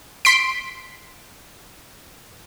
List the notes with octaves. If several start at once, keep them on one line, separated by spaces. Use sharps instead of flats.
C6 B6 D7